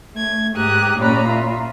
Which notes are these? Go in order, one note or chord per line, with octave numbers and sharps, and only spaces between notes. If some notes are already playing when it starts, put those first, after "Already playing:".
A3 G#6
G#2 G4 A#5 D#6 F#6
A#2 C#4 D5 A#5 B5
F4 E5